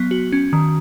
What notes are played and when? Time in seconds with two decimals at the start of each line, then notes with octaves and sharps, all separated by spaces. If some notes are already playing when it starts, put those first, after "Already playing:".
Already playing: F#3 B3
0.11 F#4
0.32 C#4
0.53 D#3